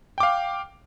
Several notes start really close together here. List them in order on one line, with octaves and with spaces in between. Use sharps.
G5 D6 F5